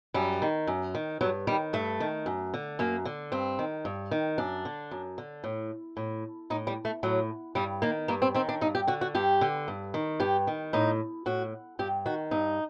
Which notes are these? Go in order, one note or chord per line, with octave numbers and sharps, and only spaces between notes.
F#2 G3
D#3
F#2
D#3
G2 F#3
D#3 G3
G2 A3
D#3
F#2
D3
F#2 A#3
D3
G2 C4
D#3
G2
D#3
F#2 D4
D3
F#2
D3
A2
A2
A2 D#4
G3
A3
A2 F#3
G2 G3
D#3 A#3
G2 A#3
C4
D#3 C4
D4
G2 D#4
G4
D3 F#4
F#4
G2 G4
D3
G2
D#3
G2 G4
D#3
A2 D#4
A2 F#4
G2 G4
D#3 F#4
G2 D#4